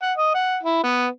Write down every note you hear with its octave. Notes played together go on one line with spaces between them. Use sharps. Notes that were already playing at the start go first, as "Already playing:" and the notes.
F#5
D#5
F#5
E4
B3